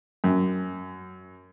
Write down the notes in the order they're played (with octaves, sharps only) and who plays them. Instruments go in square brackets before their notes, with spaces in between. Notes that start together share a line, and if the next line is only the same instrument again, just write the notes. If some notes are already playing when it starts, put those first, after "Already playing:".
[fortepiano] F#2